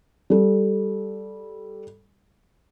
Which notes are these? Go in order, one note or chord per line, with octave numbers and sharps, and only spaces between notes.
G3 A4